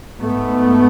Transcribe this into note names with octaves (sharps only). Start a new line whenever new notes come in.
G#2 A3 B3